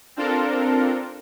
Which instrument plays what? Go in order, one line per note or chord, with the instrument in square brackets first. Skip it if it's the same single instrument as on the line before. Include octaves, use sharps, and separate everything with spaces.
[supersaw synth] C4 D4 F4 A4 A#4